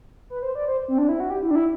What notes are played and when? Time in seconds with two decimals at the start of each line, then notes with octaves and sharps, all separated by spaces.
0.30 B4
0.43 C5
0.55 D5
0.68 C5
0.88 C4
0.98 D4
1.09 E4
1.20 F#4
1.30 G4
1.43 E4
1.51 D4
1.56 E4